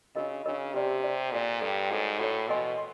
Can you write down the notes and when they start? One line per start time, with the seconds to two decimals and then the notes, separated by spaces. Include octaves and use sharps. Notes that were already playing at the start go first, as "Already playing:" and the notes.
0.15 C#3 D4 F#4 A#4 D#5
0.45 C#3 D4 F#4 A#4 D#5
0.74 C3 G4 B4 D5
1.04 G4 B4 D5
1.32 A#2 A4 D5 G5
1.61 G2 A4 D5 G5
1.90 G#2 F#4 A4 C#5
2.19 A2 F#4 A4 C#5
2.48 B2 A#4 D#5 G#5 C6
2.78 C6